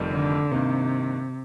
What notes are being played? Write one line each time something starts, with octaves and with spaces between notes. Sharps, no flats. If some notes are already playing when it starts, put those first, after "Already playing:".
Already playing: F1 F2 D#3 G3 C4
D3
G2 C3 D#3 A#3